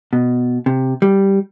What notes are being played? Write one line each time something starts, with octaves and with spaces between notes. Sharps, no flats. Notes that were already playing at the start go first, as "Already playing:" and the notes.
B2
C3
G3